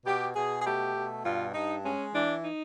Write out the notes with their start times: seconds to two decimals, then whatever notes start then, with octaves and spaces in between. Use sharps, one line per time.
0.05 B2 G4
0.34 B2 G#4
0.60 G#4
0.64 A3 G4
0.94 B2
1.24 G2 F4
1.54 G2 D#4
1.83 G#3 C#4
2.13 E3 D4
2.43 D#4